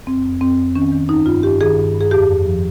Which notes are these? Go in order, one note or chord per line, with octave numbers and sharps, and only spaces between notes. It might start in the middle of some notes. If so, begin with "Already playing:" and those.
F2 C4
F2
F2 C4
F2
D#3 C#4
D#3
G2 D#4
G2 F4
G2 G4
D#3 G#4
G2
G2
G#4
F2 G4
F2
F3